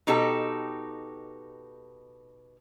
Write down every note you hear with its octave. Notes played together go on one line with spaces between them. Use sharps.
B2 D#4 G4 A4